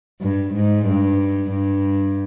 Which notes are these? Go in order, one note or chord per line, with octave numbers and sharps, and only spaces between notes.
G2
G#2
G2
G2